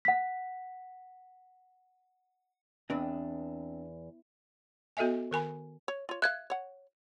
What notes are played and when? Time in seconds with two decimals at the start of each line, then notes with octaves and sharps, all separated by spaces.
0.05 F#5 B6
2.90 E2 C4 D4 B4 D#5
4.97 B3 F#4 A4 D#5 E5 G#5
5.31 D#3 A#4 G#5 B5
5.88 C#5
6.09 F4 C#5
6.22 E5 F5 F#6 G#6
6.50 C#5 F#5